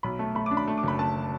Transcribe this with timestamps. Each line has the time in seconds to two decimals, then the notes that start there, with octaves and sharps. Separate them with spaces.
0.03 B1 B5
0.19 A3
0.35 A3 B5
0.46 D4 D6
0.57 B5
0.67 A3
0.78 D6
0.83 F#1 B5
0.99 A3 A5